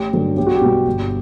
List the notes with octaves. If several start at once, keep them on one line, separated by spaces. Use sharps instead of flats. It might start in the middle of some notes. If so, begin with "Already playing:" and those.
Already playing: A1 G4
G2 D3 F#3
B1 G4
F#4
G4
B2 G3
G1